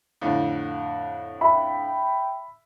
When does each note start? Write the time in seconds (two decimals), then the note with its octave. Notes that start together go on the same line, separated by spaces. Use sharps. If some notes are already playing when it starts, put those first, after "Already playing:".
0.21 F2 A2 D3
1.41 E5 G5 B5